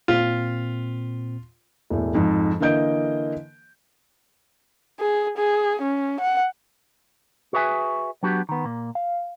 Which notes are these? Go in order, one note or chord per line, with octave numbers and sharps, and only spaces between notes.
A#2 C4 F4 B6
E1 A2
F2 G#2
D3 E3 A#3 D#5 G6 D7
G#4
G#4
C#4
F#5
F#4 G#4 B4 E5 G#5
F#3 B3 D4 F#4 G4
D#3 B3
A#2 A#3
F5